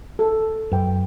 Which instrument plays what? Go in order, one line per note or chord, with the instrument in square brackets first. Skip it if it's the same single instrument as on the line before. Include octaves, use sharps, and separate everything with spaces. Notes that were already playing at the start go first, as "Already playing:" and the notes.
[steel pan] A4
[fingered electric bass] F#2 [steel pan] B4 G5